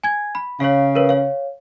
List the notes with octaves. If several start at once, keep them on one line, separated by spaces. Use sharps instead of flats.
G#5 G#6
B5
C#3 C#5 F5
A#4 B4 C#5
C#5 F5